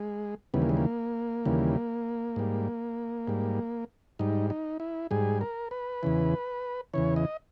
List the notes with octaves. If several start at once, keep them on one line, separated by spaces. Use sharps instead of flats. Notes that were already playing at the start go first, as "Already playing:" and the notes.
Already playing: G#3
D#2 C#3 E3 G3 B3
A#3
G#3
A#3
D#2 C#3 E3 G3
G#2 G3
G#2 G3
G#2 G3 D#4
D#4
E4
G#2 G3 G#4
A#4
B4
E2 C#3 E3
E2 C#3 E3 C#5
D#5